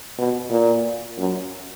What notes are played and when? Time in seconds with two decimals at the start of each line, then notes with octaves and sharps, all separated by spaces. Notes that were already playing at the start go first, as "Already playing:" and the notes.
0.18 B2
0.50 A#2
1.18 F#2